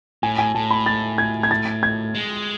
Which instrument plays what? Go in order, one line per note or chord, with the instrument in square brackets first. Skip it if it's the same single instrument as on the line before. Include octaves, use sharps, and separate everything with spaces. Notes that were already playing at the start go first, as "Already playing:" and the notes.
[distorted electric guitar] A2 [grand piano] G#5
[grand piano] G#5
[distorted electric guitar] A2 [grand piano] A5
[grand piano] B5
A6
G#6
G#6
A6
G#6
[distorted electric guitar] G#3